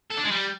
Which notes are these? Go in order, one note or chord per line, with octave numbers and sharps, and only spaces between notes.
A4
D4
G#3
G3